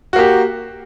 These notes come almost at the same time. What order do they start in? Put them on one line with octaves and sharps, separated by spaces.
F#4 A#3 G4